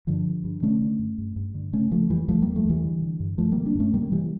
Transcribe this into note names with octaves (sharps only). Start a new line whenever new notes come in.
G2 D3 F3
G2
G2
D3 A3 C#4
D3
G2
G2
G2
D3
C#3 A3 C#4
C#3 F3 A3
F2 E3 G3
E2 F3 A3
E2 G3 A#3
F3 A3
E2 E3 G3
D3
D3
G2
G2 F3 A3
D3 G3 A#3
A#3 D4
G2 A3 C#4
C#3 G3 A#3
C#3 E3 G3